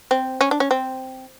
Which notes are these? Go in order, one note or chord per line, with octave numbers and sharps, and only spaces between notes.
C4
C#4
D4
C#4
C4